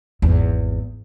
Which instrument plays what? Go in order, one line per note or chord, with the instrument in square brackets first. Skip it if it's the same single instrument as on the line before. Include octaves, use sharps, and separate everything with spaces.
[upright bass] G#1 E2